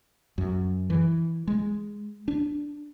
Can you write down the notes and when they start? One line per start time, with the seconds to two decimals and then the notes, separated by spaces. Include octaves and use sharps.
0.38 F#2
0.90 E3
1.47 G#3
2.28 D4